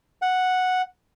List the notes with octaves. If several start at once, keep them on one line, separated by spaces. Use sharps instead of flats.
F#5